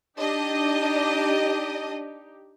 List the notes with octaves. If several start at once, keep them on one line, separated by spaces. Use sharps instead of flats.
D4 D#4 G4 D#5